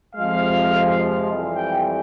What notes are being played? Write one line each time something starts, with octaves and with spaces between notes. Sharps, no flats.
F2 C3 F3 G#3 F5
F2 E3 G3
G5